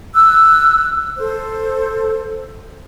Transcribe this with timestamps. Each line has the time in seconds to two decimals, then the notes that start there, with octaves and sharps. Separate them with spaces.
0.14 E6 F#6
1.18 A4 C5